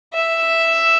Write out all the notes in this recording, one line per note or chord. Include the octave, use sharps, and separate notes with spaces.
E5